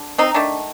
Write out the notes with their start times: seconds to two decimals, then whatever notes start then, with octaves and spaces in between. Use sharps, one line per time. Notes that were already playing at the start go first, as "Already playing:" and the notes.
Already playing: D3
0.18 C4 D#4
0.34 D#3 A3 D4